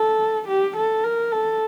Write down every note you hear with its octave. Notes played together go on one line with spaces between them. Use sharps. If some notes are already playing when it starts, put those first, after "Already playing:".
Already playing: A4
G4
A4
A#4
A4